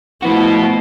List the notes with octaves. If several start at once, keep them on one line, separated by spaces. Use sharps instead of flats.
F3 A3 B3 E4 F#4